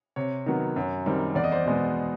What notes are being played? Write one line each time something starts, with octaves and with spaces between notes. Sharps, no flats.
C3 C#5
D#3 F#3 B3
F#2
D#3 G3 C4
E2 D5
D#5
C5 D5
B2 G#3 B3